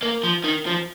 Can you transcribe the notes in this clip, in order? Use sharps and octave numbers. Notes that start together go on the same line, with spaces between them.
A#3
F3
D#3
F3